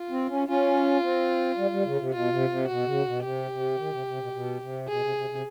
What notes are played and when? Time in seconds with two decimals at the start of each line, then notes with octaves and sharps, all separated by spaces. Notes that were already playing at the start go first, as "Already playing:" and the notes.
Already playing: F4
0.11 C4
0.29 C#4
0.48 C#4 F4
1.02 C4
1.57 G3
1.71 G3
1.85 C#3
1.99 C3
2.13 B2 F4
2.31 C3
2.49 C3
2.68 B2 F#4
2.86 C#3
3.05 B2
3.23 C3 G4
3.51 C3
3.78 D#3
3.92 C3
4.06 C3
4.20 B2
4.33 B2
4.62 C3
4.88 B2 G#4
5.02 C3
5.16 C3
5.30 C3